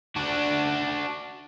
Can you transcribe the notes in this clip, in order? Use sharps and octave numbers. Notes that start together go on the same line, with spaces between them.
D4 F#4